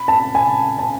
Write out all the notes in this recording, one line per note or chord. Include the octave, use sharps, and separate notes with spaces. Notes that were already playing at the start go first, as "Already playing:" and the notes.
Already playing: B5
A5
G#5
A5